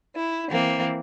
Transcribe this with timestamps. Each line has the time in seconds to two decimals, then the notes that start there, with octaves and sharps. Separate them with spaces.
0.16 E4
0.50 E3 A#3 C4